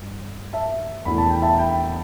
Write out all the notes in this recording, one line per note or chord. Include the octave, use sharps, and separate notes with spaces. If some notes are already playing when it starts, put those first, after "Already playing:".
Already playing: G2
E5 A5
E2 E3 A3 B5
A5
G5
E5 A5
G5 B5